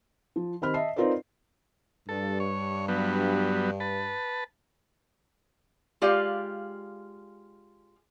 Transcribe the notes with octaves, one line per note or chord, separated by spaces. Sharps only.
F3
D#3 C4 G4 B5 F6
D#5 E5 A5 C7
C4 D#4 F4 A#4 B4 D5
G2 A4
C#5
F#3 G3 B3
B4 A5
G#3 F4 G4 D5 F5